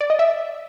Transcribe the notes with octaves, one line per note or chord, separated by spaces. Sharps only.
D5
D#5
E5